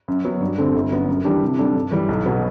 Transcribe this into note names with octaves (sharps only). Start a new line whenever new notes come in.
F#2
F#3 B3
G2
D3 A3 C4 G4
G1
F#2 F#3 B3
F#2
E3 G3 D4 G4
C3
G3 D4 A4
G2
E3 G3
B1
B2 F#3 B3